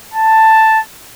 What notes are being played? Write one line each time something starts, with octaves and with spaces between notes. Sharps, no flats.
A5